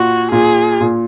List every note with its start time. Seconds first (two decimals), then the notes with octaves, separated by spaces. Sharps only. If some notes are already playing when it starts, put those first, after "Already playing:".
Already playing: A#2 F#4
0.31 A#2 G#4
0.81 A#2